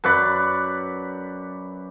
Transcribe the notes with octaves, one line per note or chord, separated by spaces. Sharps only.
F#2 B4 D5 B5